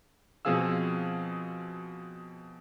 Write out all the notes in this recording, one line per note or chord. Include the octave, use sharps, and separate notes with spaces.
B2 F3 C4 G#4 F5 E6